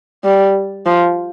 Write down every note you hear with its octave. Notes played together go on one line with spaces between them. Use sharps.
G3
F3